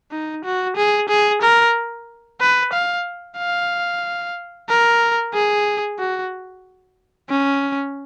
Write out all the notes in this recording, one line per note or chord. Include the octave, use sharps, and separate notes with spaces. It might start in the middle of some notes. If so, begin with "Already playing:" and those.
D#4
F#4
G#4
G#4
A#4
B4
F5
F5
A#4
G#4
F#4
C#4